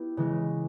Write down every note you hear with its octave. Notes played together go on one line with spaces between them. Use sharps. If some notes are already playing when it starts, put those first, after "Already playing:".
Already playing: B3 E4 G4
C#3 E3 G#3 C#4